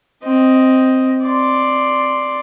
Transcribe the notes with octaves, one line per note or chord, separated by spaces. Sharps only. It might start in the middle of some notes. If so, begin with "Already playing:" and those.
C4 D#5
D5 C6